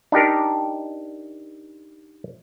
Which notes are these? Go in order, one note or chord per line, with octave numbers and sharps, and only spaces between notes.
D4 D#4 G4 A#4